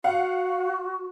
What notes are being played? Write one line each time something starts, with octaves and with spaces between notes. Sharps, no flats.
F#4 F5 F#5